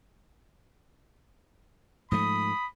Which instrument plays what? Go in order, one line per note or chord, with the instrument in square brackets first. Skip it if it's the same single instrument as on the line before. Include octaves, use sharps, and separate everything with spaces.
[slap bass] G#2 F3 A3 [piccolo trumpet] B5 [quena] D#6